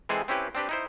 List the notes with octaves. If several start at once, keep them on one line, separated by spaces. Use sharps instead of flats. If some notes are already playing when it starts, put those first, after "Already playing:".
E3 G#3 C4 G#4 A4
C4 C#4 E4 G4 B4
C4 D4 G4 B4
D#4 E4 C5